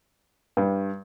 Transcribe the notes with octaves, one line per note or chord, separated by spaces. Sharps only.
G2